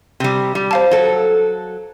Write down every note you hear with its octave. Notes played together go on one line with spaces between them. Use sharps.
C3 G3
G3
C5 F5 A5
F#3 A4